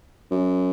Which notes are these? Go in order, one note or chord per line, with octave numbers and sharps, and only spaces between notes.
F#2